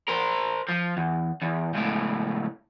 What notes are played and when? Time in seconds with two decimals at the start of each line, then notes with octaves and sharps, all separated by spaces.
0.08 A#4 C5
0.69 F3
0.97 E2
1.42 E2
1.74 C#2 A2